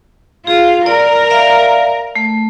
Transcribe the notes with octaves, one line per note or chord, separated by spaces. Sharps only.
F4 G#4
A#4 D5
D5 E5 F5
A3